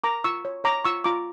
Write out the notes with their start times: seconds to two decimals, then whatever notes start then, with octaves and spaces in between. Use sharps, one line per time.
0.04 A#4 A#5 D6
0.24 F4 C#6 E6
0.45 C#5
0.64 C#5 A#5 D6
0.85 F4 C#6 E6
1.04 F4 A#5 D6